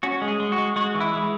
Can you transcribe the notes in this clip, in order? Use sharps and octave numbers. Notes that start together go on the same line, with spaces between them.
C#4 F#4
G#3
G#4
G#3
F#4
G#3
G#3 F#4
E3
E4
G#3